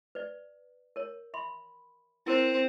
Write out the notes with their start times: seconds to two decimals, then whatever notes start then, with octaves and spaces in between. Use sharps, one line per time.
0.15 B4 D5
0.96 A#4 C#5
1.34 E5 B5 C6
2.26 C4 E4 A#4 C5